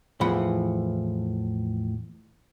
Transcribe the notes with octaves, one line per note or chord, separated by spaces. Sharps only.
E2 A2 E3 F3 F#5 B5